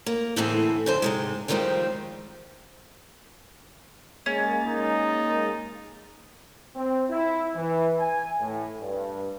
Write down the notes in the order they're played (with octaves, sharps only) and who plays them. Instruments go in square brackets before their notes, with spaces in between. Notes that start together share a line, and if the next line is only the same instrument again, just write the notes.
[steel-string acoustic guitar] A#3
D2 A2 E3 C4 G#4
F2 D3 C5
G#2 C3 G#3
F2 D#3 F3 G3 G#3 C4
[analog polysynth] G#3 A#3 A6 [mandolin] C#4
[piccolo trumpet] D#4
[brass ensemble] C4
E4
E3
G#5
A2
G2